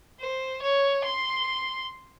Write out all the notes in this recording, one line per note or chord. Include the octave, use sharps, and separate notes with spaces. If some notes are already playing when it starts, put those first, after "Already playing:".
C5
C#5
C6